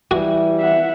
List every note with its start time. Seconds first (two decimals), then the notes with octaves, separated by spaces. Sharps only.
0.11 E3 G3 F#4
0.59 E5 F#5